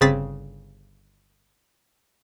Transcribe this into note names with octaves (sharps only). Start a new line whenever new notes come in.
G1 C#3 C4 G#4 A6 B6